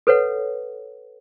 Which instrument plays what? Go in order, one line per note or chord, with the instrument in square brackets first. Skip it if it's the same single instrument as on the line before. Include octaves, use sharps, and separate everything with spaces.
[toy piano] A4 B4 C#5 F#5